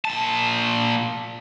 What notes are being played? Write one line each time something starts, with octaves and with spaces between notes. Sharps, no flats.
A#2 A5